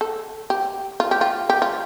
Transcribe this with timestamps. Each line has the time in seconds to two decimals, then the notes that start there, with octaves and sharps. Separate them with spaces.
0.01 A4
0.50 G4
1.00 F4
1.11 G4
1.21 F4
1.50 G4
1.62 F4